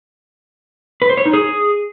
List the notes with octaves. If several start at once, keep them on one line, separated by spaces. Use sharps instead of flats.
B4
C5
C#5
D#4
G#4